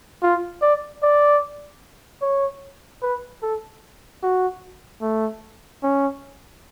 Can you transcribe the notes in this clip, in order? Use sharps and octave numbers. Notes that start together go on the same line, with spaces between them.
F4
D5
D5
C#5
B4
A4
F#4
A3
C#4